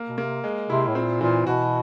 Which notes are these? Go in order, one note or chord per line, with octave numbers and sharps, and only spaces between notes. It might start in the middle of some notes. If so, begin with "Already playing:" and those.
Already playing: A#3
B2
C3 A#3
G#3
C3 E4
A2
A#2 C4
A#2 E3
B2 F#4